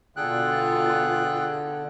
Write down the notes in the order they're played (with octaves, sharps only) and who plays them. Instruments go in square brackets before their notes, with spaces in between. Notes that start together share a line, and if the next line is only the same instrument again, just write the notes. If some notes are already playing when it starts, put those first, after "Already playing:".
[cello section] B2 F4 [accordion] D3 [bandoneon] G#4 A4 G5 [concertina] F#6